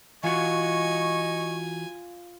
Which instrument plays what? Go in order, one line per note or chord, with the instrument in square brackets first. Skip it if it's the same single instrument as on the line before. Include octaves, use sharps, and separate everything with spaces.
[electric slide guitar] E3 F#4 [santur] F4 [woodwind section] D#5 C#6 [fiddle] G#5